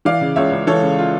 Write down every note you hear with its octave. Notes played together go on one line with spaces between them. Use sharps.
E3 D5 F5
C#3
C#2 C#5 E5
C#2
E3 A4 C#5
C#3
F4